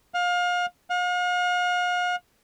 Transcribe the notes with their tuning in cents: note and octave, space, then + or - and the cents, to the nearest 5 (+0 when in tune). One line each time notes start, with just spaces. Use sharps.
F5 +30
F5 +45